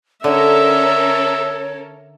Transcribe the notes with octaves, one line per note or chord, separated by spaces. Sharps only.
D3 C#4 A4 A#4 C#5 E5